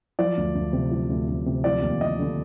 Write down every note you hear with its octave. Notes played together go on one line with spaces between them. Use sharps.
F3 D5
D2
D2
C3
F3
D2
D2
C3
F3 D5
D#2
D#2 D#5
D3